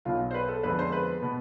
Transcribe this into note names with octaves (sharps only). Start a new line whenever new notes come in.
B1 B2 B3 F4
C5
B4
A4
F2 D3 G#3 B3 B4
C5
B4
B2 B3